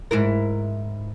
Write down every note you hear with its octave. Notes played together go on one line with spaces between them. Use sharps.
G#2 E4 A#4